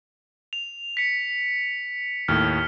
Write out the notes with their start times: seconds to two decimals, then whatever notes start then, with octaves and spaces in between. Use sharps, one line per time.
0.53 F7
0.97 B6 C#7
2.28 D#2 A2 F6